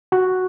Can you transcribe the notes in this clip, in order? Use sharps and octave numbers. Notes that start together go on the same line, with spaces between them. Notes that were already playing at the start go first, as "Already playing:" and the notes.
F#4